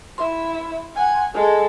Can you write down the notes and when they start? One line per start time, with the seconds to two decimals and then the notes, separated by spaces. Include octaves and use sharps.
0.18 E4 E5 C6
0.95 F#5 G#5
1.34 G#3 A4